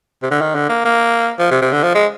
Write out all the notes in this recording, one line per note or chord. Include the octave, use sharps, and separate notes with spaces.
C3
D3
D#3
D3
A#3
A#3
F3
C3
C3
D3
F3
G#3